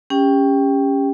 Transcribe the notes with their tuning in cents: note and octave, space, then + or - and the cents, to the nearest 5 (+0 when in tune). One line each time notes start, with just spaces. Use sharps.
C#4 +0 G4 +25 G5 +0